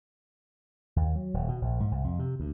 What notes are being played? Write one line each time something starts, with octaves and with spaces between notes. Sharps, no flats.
D#2
F#3
D#1
B2
A#1
G#2
C2
F2
C3
D2